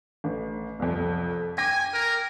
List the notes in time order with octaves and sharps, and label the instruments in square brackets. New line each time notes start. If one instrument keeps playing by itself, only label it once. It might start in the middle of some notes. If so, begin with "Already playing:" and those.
[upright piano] A1
C2 F2
[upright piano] G5 D6 A#6 [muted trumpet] G#5
[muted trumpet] A#4